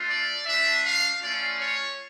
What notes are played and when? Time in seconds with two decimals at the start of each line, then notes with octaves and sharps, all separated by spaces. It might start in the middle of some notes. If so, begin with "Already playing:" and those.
Already playing: A3 D4 F4
0.09 D5
0.46 A3 D4 F4 E5
0.84 F5
1.22 A3 C#4 F4 D5
1.59 C#5